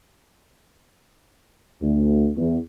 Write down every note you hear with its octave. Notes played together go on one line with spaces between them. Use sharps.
D2
E2